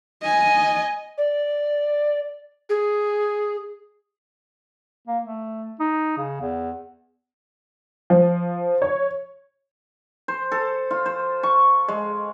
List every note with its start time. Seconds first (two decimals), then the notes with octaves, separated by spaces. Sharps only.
0.23 D#5 G#5
1.18 D5
2.69 G#4
5.07 A#3
5.23 A3
5.80 D#4
6.17 C#3
6.41 E2
8.10 F3
8.82 C#5
10.28 C5
10.52 A4
10.91 F4
11.06 C5
11.43 C#6
11.88 G#3